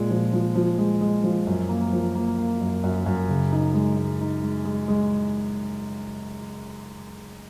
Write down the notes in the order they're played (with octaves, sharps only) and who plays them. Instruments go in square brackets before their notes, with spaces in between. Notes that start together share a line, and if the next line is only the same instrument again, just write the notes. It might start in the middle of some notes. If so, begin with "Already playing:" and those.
Already playing: [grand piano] A#2 G#3
F3
F3
F3
G#3
G#3
F3
F#2
A#3
F3
A#3
A#3
F#2
F#2
F#2
C#3
D#4
G#3
G#3
D#4
G#3
G#3
G#3